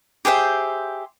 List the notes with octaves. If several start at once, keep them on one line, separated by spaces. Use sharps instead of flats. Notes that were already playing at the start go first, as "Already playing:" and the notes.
G4 G#4 C5 E5